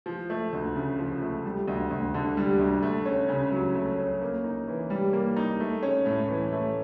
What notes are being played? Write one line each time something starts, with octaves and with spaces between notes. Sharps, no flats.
F3
A3
D2
C#3
F3
A3
G3
D2
D2
D3
G3
D2
A3
C#4
C#3
F#3
A3
C#4
A#3
D#4
E3
G3
A#3
D#4
A3
C#4
A2
E3
A3